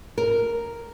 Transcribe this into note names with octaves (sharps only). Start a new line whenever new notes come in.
A#4